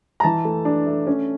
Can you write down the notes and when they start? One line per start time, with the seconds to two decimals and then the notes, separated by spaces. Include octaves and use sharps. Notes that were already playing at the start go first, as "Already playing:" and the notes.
0.20 A#5
0.23 E3 A5
0.45 A3
0.65 D4
0.86 A3
1.07 C#4